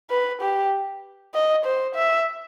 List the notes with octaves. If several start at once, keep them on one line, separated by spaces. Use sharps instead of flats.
B4
G4
D#5
C5
E5